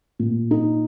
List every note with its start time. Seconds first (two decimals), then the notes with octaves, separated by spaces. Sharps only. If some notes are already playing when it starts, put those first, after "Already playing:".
0.19 A#2
0.51 D#4